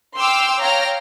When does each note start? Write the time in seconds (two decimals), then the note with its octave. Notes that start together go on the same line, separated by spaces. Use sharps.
0.17 G5 C6 D6 E6 F6
0.60 C#5 F5 G5 A#5 F6 A#6